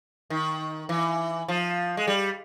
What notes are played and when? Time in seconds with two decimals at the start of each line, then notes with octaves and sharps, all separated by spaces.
0.30 D#3
0.89 E3
1.48 F3
1.97 G#3
2.07 G3